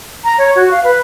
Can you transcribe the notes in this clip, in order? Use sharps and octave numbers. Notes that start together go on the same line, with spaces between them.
A#5
C#5
F#4
F5
B4